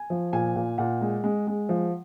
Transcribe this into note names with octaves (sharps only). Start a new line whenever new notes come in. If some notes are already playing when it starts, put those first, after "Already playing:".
Already playing: G#5
F3
A#2 G#5
A#2
A#2 F#5
G#3
G#3
G#3
F3